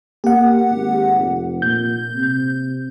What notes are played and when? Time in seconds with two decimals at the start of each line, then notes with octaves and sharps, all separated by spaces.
0.24 A#3 G4 F#5
0.71 G#1
1.15 F1
1.62 A#2 G6
2.14 C3